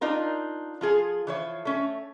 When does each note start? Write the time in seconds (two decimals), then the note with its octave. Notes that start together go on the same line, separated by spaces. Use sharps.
0.01 D4 D#4 F4 A#4
0.81 F3 F4 G#4 A4
1.27 E3 F3 C#5
1.65 A3 C#4